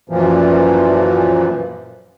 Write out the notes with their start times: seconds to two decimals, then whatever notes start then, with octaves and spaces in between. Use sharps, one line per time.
0.10 F#2 A#2 E3 F3